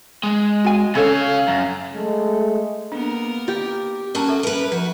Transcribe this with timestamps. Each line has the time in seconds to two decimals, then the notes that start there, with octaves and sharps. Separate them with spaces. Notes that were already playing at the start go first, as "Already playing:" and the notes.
0.23 G#3
0.64 F#4 G#5
0.95 C#3 C#4 A4 C#5 F5
1.48 F#2
1.94 G#3 A3
2.92 A#3 B3 D4 A#4
3.48 G4
4.15 C#4 F#4 A#4 A5 A#5
4.28 A4 E5
4.43 A#4 B4
4.72 F3 F#4